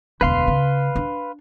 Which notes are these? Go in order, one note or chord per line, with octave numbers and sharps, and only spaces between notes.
E1 D2 B4 F5 C6
C#3
D4